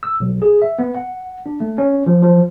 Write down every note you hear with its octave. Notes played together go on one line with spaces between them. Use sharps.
E6
B1
G#4
E5
B3
F#5
D4
A3
C#4
F3
F3